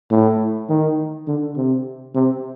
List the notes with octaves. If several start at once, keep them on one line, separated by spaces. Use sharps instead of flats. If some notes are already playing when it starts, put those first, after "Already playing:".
A2
D#3
D3
C3
C3